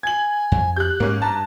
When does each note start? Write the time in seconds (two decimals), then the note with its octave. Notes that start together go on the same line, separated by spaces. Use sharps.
0.03 G#5 G#6 F#7
0.52 F2
0.76 G4 F#6 G6
1.00 G#2 G#3 A#3 C#4
1.22 G2 A5 A#5